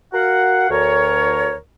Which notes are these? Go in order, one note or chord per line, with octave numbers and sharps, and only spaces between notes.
F#4 A#4 F5 F#5
D2 A#4 C#5